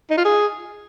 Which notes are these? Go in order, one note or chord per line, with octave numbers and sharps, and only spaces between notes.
D#4
F4
G#4